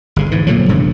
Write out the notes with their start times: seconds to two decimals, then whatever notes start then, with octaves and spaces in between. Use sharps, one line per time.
0.16 G1 C#3
0.31 G#2 E3
0.47 A#2 D3 F3 F#3
0.69 E1 G2 C#3